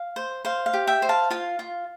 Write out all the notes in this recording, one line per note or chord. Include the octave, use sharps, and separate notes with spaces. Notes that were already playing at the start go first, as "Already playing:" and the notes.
Already playing: F5
C5
C5 F5
F5
G4
E5 G5
C5
F5 A5
F4 F5
F4